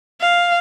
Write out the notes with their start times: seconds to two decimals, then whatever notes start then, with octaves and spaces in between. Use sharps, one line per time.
0.21 F5